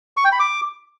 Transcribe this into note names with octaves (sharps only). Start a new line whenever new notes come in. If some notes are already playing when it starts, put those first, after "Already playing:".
C#6
G5
B5
D6